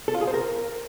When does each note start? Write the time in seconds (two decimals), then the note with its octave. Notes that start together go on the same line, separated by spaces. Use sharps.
0.08 A4
0.14 F4
0.21 G#4
0.27 C5
0.34 A#4